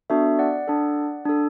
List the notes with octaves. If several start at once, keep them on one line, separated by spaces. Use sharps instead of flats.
B3 D4 F#4 A4 E5
D5 F#5
D4 A4
D4 A4